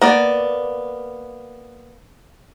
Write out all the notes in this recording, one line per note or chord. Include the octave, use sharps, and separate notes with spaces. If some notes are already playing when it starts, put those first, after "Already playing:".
A#3 B3 D5